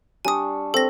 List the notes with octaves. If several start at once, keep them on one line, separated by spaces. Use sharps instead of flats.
G3 D4 G#5 C#6 D#6
C4 A4 A#6